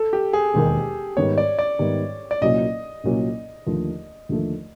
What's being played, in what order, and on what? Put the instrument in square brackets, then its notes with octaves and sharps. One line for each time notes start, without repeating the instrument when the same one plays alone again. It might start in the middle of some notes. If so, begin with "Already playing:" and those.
Already playing: [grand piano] A4
G4
G#4
[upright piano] E1 D#2 D#3
[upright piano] G#2 D#3 G3 B3 [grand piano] C#5
[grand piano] D5
D5
[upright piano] G#2 D#3 G3 B3
[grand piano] D5
[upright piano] C2 A#2 F#3 A#3 C#4 [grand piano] D#5
[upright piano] C2 A#2 F#3 A#3 C#4
D#2 D3 F3 A3
D#2 D3 F3 A3